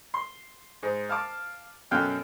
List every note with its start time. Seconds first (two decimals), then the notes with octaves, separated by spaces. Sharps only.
0.14 C6
0.83 G#2
1.09 F5 A5 D6
1.91 F#2 B2 A4 F5 G5 F#6